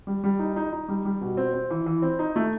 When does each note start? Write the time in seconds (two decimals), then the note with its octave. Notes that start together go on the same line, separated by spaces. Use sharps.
0.07 G3
0.24 G3
0.39 D#4
0.56 D#4
0.73 D#4
0.88 G3
1.05 G3
1.21 B2
1.37 C4
1.54 C4
1.70 E3
1.86 E3
2.02 C4
2.19 D#4
2.36 A3